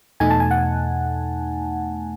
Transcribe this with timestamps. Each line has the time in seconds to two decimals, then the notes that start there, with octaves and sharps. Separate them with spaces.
0.20 E2 B2 A3 D#4 G#5
0.30 A5
0.40 G#5
0.51 F#5